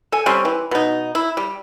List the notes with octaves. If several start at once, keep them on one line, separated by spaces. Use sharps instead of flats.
A4 G#5
G3 C4 C#4
E3
B2 D#4
E4
G3